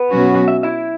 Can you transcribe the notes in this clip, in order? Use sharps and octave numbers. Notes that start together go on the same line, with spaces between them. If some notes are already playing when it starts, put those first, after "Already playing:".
Already playing: B3 B4
B2 F#3 C#4 F#4
E5
E4 E5